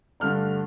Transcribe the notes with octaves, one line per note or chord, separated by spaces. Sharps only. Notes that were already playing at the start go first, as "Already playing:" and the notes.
G2 D3 A3 D4 F6